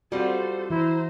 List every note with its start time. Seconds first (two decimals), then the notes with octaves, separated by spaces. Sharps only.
0.12 G3 C4 F4 F#4 A4 C5
0.70 E3 E4 C5 A#5